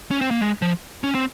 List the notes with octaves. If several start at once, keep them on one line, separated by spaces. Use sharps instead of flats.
C#4
C4
A#3
G#3
F3
C#4
C4